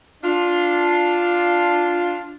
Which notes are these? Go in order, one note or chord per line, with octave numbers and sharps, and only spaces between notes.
D4 F4